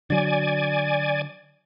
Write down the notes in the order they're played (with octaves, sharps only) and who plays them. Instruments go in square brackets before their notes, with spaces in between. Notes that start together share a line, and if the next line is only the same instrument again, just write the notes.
[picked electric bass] D3 F#3 [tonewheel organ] D5 G#5